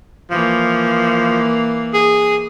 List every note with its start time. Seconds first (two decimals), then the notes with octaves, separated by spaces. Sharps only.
0.31 E3 F3 A#3
1.94 G#4